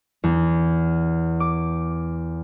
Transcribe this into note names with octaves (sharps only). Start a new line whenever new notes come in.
E2
D6